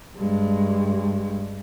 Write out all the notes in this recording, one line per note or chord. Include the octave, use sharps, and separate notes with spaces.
G2 G#3